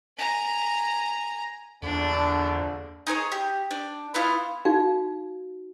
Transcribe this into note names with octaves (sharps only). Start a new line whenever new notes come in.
G#5 A#5
A#1 E2 D3 D4
D#4 G#4 C5 C#5
G4
D4
B3 E4 F4
D#4 F#4 F5